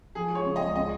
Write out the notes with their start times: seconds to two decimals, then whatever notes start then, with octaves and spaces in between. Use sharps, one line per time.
0.15 F3 G#4
0.31 G#3 C#5
0.46 C#3
0.56 C#2 D#5
0.76 C#4 D#5